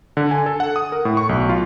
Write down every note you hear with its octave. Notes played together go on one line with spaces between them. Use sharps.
D3
G#5
A4
F#5
D#6
A#4
A2
C#6
B1
F4